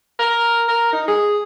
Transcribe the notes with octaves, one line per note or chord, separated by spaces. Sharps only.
A#4
A#4
D#4
G#4